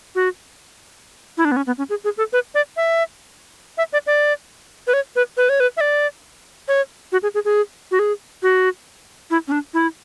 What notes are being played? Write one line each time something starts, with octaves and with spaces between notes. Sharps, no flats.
F#4
E4
D4
B3
C#4
B3
C#4
G#4
G#4
A4
B4
D5
E5
E5
D5
D5
B4
C#5
B4
B4
C#5
B4
E5
D5
C#5
F#4
G#4
G#4
G#4
F#4
G#4
F#4
E4
C#4
D4
E4